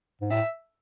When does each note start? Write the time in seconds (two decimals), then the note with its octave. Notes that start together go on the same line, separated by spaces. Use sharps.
0.21 G#2
0.31 A2 E5